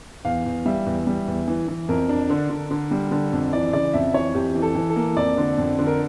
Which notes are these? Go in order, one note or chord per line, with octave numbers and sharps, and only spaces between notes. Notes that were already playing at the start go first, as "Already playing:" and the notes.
E2 F5
E2
G3 E5
E2
G3
E2
E3
E3
F2 A#4
D4
D3
D3
D3
G3
D3
F2
E3 D5
C#3 D5
F2 E5
E3 C#5
F2 G4
E3
A4
E3
A4
A#3
F2 D5
D3
F2
D3
A#4